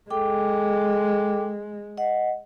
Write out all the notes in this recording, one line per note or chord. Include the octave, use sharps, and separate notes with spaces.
G#3 A4 G5 D6
D#5 F#5